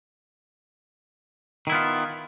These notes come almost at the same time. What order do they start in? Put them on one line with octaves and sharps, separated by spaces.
D#3 E4 B3 F4